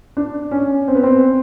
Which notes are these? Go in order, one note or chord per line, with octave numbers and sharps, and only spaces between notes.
D4
C#4
C4
B3
C4